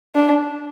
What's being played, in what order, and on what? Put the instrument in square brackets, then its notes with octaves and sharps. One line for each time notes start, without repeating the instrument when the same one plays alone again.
[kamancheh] D4